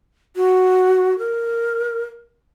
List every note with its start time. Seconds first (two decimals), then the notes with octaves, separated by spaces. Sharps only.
0.36 F#4
1.19 A#4